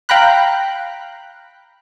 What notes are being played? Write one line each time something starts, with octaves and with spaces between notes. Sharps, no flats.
F5 G5 A#5 B5 F#6